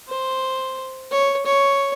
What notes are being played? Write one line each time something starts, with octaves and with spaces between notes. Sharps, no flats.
C5
C#5
C#5